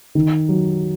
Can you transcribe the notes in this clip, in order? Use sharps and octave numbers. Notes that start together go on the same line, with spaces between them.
D#3
F#3